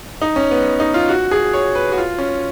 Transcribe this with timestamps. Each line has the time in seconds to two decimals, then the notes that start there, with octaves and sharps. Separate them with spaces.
0.22 D#4
0.36 C#4
0.51 B3
0.80 D#4
0.94 F4
1.09 F#4
1.31 G#4
1.53 C#5
1.75 B4
1.92 F#4
1.98 F4
2.18 C#4